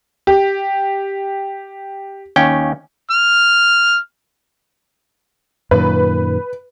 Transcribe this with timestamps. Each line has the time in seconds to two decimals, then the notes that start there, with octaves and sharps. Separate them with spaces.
0.27 G4
2.36 D#2 C#4 G5
3.11 F6
5.71 F#2 A#2 D#3 B4